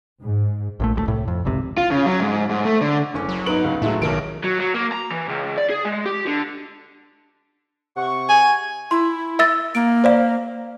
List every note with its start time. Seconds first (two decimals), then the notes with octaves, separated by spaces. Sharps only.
0.22 G#2
0.80 A#1 A#2 A3
0.96 D1 G3 A3
1.08 C2 A2
1.28 F2
1.45 G#1 C#2 C3
1.77 F4
1.91 C#3
2.06 F#3
2.20 G#2
2.50 G#2
2.65 A3
2.81 D3
3.14 F#1 C#4 D6
3.28 F#3
3.46 G#2 B3 D#4 D7 F#7
3.64 C#2 C#3 B3
3.82 A2 F#3 G#3 A3 E4
4.02 B1 D#3 A#4 D7
4.44 F#3
4.60 F#3
4.74 A#3
4.92 A#5
5.11 E3
5.29 C#2
5.57 D5
5.70 G#4
5.85 G#3
6.06 G4
6.27 D3
7.97 C3 F#5 C#6
8.29 G#5
8.91 E4 C6
9.39 E5 E6 A6
9.75 A#3 D7
10.04 C5 D5 F5